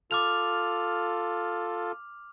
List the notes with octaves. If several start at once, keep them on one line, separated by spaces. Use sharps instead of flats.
F4 A4 D6 F6 F7